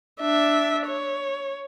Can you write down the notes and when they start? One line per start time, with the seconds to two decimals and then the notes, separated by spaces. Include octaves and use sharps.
0.21 D4 E5
0.86 C#5